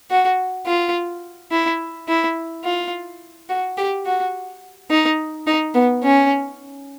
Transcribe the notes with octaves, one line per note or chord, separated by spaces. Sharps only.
F#4
F4
E4
E4
F4
F#4
G4
F#4
D#4
D#4
B3
C#4